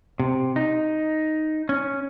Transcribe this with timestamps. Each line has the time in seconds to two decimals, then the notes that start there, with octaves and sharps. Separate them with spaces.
0.20 C3
0.56 D#4
1.69 C#4